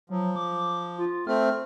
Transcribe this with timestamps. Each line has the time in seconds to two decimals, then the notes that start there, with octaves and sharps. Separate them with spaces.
0.10 F3 F#3
0.36 D6
0.98 F4
1.27 A3 C4 F6